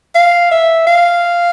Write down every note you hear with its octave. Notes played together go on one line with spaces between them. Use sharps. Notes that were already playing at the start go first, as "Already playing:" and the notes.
F5
E5
F5